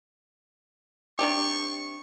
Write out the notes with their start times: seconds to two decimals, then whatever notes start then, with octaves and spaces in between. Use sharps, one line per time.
1.19 C3 D4 G4 C#6